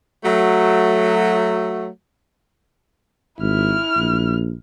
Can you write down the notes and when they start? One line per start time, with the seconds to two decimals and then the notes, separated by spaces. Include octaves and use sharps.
0.24 F#3 A3
3.40 G#1 E4 F6
3.96 A#1